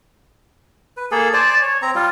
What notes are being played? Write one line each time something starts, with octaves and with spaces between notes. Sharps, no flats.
B4
A#3 G#4 A4
C5 D5 G#5 A5
C#5
C4 A#5
G3 F4